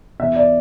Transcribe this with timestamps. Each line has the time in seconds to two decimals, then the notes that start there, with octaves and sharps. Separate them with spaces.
0.19 E2 E5
0.36 D5